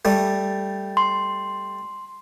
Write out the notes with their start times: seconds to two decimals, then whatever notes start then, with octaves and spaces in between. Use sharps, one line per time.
0.05 G3 A3
0.97 C6